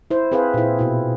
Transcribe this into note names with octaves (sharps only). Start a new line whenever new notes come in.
E4 C5
C4 G#4 B4 C5 F5
A#2 E4
B2 E4